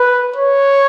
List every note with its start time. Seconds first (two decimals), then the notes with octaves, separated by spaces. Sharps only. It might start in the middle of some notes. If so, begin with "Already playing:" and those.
Already playing: B4
0.36 C#5